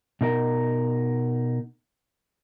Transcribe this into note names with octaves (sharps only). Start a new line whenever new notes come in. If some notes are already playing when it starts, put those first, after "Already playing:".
B2 D#4 A#4